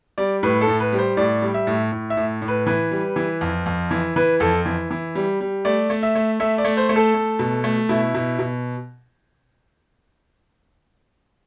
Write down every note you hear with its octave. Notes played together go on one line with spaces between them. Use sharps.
G3 D5
A2 B4
A4
A2
B4
G3
C5
A2 D5
G3
E5
A2
A2
E5
A2
A2
B4
E3 B4
G3
E3
F2
F2
E3
E3 B4
F2 A4
E3
E3
G3
G3
A3 D5
A3
E5
A3
A3 E5
D5
A3
C5
A3
A4
A3
B2
A3
B2 E4
B2
B2